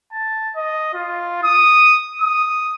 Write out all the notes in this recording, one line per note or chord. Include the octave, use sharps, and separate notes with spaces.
A5
D#5
F4
D#6
D#6